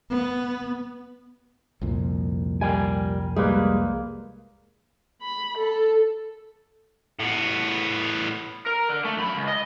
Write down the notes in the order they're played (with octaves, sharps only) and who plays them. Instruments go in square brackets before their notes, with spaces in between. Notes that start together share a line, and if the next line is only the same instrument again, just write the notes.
[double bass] B3
[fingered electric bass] C2 F2 A#2
[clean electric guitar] G3 [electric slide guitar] A#4 G5 G#5
[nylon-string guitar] G3 [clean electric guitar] G#3 A#3 [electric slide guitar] G#4 B4
[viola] B5
A4
[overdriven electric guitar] A2 B3
A#4
D3
A3
F#2 B5
C#2
D#5